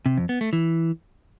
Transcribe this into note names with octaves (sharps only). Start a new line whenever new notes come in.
C3
F2
B3
A3
E3